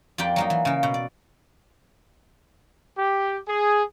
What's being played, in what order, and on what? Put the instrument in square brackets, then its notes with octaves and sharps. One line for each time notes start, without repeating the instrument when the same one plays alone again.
[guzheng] F2 A#3 G4 D5 G5
F#3 A#3 D#4
E3
C#3 A#3
B2
D5
[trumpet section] G4
G#4